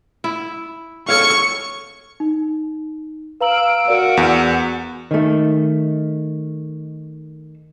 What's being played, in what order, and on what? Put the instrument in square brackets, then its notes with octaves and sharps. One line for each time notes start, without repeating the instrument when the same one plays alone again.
[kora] E4
[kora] A4 C#5 F5 [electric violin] C#6 C#7
[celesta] D#4
[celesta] B4 A#5 F#7 [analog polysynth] F5 E6 D7
[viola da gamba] F#4 [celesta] A#4 D5
[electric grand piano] E2
[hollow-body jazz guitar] D#3 A3